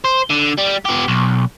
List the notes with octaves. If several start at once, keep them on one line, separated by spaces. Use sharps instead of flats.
C5
D3
G3
B3 G4
B1